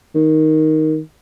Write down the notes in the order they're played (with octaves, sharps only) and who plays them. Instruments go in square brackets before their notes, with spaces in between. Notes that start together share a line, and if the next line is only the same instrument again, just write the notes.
[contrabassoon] D#3